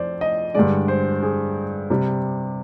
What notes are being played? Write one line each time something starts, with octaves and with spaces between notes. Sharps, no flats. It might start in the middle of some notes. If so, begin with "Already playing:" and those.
Already playing: F2 C5 D5
D#5
G2 D3 G#3 D5
C5
G#4
C3 G3